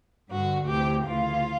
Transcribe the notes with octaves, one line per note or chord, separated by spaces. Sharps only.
G2 D3 F#4
D2 C3 E3 G4
D2 C#3 E3 F4